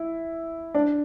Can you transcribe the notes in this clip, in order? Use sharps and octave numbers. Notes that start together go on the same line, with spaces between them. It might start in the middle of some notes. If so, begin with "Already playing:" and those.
Already playing: E4
D4